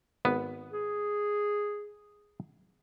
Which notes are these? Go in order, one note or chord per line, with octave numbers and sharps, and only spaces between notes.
G#1 B3
G#4